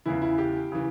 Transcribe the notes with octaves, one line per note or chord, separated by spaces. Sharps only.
E2 C#3 E3 E4
E4
G4
C#3 E3